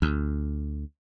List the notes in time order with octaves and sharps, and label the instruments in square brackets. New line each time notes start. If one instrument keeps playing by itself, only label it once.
[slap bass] D2